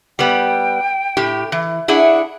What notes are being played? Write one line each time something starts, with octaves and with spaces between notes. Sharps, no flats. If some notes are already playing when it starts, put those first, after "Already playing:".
G3 B3 G5
A2 G4
E3
D4 E4 G#4 F#5